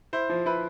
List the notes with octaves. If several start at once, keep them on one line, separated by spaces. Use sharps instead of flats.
E4 C5
F3
E4 B4